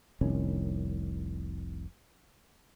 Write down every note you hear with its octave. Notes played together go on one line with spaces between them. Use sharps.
F1 C2 D#3 C#4